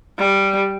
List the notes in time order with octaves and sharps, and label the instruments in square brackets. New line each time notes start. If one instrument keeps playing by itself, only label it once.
[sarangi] G3